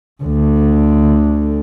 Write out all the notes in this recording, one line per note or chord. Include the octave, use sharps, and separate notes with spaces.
D2 D3